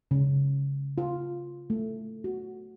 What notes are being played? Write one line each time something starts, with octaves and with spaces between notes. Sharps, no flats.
C#3
F4
A3
F#4